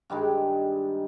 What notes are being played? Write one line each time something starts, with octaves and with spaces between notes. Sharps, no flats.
G2 D#3 G3 G#3